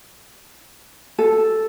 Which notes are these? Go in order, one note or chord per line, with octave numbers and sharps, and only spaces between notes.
A4